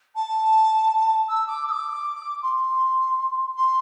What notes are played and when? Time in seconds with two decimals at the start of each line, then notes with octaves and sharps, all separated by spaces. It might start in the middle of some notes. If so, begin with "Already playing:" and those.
0.15 A5
1.29 E6
1.48 D6
1.67 E6
1.71 D6
2.43 C6
3.56 C6